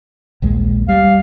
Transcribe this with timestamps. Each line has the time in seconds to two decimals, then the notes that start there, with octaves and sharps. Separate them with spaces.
0.42 A#1 D#2 G#3
0.89 G3 F5